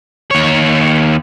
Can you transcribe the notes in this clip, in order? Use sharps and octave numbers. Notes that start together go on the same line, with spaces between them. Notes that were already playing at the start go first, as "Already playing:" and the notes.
D#2 C#5